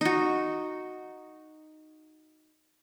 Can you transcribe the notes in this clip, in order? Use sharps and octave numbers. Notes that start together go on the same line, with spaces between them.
D#4 F#4